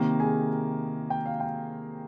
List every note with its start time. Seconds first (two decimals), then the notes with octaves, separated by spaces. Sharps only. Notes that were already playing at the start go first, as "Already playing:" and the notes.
Already playing: C3 D#3 A#3
0.20 G#4 G#5
1.10 G5
1.26 F5
1.40 G5